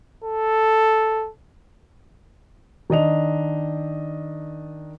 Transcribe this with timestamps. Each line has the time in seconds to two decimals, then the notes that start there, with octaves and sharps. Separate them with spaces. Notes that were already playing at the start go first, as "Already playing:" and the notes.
0.24 A4
2.90 D#3 D4 D#5 F7